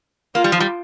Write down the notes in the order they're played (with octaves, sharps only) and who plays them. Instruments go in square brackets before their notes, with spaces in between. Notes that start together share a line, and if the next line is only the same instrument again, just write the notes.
[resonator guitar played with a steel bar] A#3 [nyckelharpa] F4
[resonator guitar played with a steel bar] G3
F3
G3